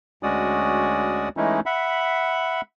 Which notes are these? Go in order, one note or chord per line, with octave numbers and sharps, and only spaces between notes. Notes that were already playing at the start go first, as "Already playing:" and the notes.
D2 G#3 C#4 F#4 D5 D#6
E3 G#3 A3 C#4 D#4 E4
E5 F#5 B5